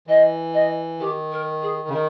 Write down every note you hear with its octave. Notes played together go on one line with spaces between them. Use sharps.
E3 D#5
D#5
D#3 G4
A#4
G#4
C#3
D#3 A#4